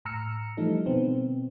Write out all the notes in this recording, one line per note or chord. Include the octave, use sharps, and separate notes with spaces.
A2 A#5 E6 F6 C#7
E3 F3 G3 A3 D#4 A4
B2 D3 B3 C4